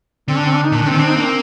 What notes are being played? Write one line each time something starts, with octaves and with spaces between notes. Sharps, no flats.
D3 C4
D4
C4
D4
D#4
A#2
D4
D3
D#3 C4
C4 D4
D#4
A#3 D4
C4